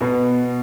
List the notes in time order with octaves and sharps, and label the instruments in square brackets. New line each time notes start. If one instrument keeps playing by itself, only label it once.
[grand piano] B2 [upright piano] B3